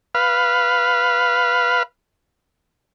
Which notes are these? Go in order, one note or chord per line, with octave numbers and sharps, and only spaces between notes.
B4 F5